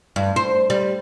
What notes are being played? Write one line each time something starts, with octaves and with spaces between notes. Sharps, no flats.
G2
C5
G3